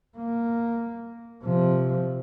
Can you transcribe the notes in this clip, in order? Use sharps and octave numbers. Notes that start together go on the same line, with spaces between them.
A#3
C3 F3